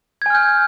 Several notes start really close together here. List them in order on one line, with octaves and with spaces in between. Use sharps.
G#6 G#5 F6 G6